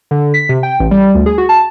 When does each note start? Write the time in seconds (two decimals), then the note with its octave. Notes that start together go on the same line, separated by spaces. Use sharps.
0.11 D3
0.34 B6
0.49 C3
0.63 G5
0.80 A1
0.91 G3
1.15 D2
1.26 G#4
1.38 F#4
1.49 A5